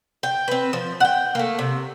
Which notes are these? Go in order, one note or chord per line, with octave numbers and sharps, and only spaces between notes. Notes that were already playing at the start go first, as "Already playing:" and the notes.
G5
C4 B4
F3
F#5 G5
A3 A#3
C3